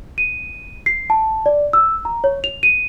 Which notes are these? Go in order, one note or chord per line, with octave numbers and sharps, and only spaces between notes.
D#7
C7
A5
D5
E6
A#5
C#5
F7
D#7